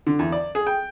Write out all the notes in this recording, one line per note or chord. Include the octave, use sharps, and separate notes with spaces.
D3
E2
D5
G#4
G5